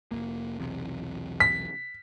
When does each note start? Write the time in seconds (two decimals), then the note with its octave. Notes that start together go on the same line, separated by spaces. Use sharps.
0.11 F1 F#2 A#3
0.60 B1 E2 C3
1.40 B6